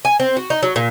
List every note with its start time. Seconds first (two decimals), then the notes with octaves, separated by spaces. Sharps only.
0.05 G#5
0.20 C4
0.37 F#4
0.50 D#4
0.63 F#3
0.76 A#2